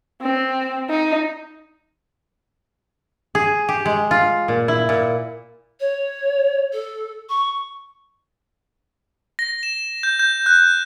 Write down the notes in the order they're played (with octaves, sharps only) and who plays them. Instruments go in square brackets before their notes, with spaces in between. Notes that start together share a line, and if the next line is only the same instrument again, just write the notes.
[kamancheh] C4
D#4
[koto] G#4
G4
G#3
F4
A#2
E4
A#2
[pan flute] C#5
A4
C#6
[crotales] A#6
E7
G6
G6
F#6